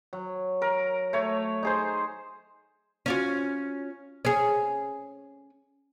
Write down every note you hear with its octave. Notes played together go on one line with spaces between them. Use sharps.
F#3
A#4
A3 C#5
D#4 G#4 C5
C#4 F4 F#4
C#4 G#4